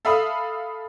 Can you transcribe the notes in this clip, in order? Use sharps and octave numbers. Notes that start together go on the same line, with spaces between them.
A4 E5 F5 B5 D#6